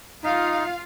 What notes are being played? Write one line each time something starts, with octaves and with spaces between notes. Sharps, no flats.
D#4 F4 F5